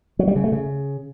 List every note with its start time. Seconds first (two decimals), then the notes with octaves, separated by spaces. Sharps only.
0.19 F#3
0.27 G3
0.36 C#3
0.44 A3
0.52 C#3